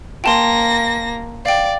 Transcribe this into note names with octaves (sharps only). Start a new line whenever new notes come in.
A#3 G5 A5 C6 A#6
D5 F5 G5